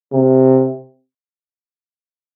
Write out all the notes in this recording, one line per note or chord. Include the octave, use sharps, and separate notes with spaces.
C3